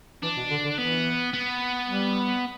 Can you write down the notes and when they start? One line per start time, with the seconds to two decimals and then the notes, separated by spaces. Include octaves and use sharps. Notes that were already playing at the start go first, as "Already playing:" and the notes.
0.23 E3 D4
0.37 B2
0.51 D3
0.65 D3
0.78 E3 B3
1.34 B3
1.89 G3